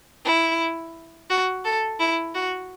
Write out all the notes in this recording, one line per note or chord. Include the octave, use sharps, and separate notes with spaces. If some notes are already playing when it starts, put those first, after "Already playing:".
E4
F#4
A4
E4
F#4